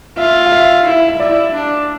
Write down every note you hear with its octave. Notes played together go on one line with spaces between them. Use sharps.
F4 E5
F5
E5
E4
E5
E4 D5
D4